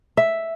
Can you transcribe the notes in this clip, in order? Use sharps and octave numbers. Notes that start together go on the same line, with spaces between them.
E5